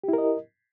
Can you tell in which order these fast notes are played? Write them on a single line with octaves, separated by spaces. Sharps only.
G4 E4 A#4 D#5